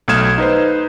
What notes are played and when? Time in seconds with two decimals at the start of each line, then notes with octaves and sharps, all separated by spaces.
0.08 B1 A3 D#6 F6 G#6 E7
0.38 D#4 B4 C5